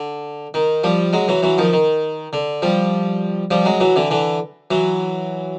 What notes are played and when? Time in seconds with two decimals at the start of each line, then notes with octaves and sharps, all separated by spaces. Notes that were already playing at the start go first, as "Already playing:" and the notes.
Already playing: D3
0.54 D#3
0.84 F3 G3
1.13 F#3 G#3
1.28 E3 F#3
1.43 E3 F#3
1.58 D#3 F3
1.73 D#3
2.33 D3
2.62 F3 G3
3.51 F3 G3
3.65 F#3 G#3
3.80 E3 F#3
3.96 D3 E3
4.10 D3 E3
4.71 E3 F#3